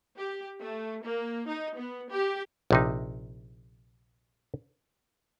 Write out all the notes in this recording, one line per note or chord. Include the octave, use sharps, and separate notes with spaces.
G4
A3
A#3
D#4
B3
G4
A#1 C3 D#4